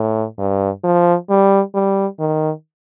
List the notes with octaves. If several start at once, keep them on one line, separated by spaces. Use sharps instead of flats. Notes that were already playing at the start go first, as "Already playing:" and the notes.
Already playing: A2
G2
F3
G3
G3
D#3